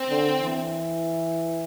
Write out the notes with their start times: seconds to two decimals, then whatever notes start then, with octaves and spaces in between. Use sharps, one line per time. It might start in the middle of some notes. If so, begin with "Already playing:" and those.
Already playing: C4
0.09 D3
0.39 E3